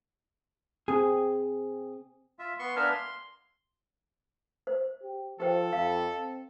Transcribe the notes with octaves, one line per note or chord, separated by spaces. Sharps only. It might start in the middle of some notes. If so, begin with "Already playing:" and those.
C4 G#4
F4 E5
B3 C6 C#6
B3 D4 A#4 E5 F5 G#5
C6
C5
G4
F3 G4 A4 C5 G5
F2 F5
C4